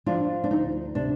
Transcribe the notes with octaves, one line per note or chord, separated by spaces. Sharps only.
F3 D4 F4
D4
D2 D#4
C3 D4